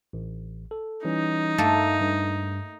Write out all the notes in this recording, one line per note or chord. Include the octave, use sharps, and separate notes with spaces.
A1
A4
E3 G3 C#4 D#4
G2 A3 A#3 A4
G2